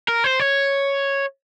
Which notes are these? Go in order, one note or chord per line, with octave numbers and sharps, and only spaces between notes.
A#4
C5
C#5